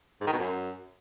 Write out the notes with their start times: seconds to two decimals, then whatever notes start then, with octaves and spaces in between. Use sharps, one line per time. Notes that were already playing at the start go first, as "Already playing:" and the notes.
0.21 G#2
0.27 D#3
0.33 B2
0.39 F#2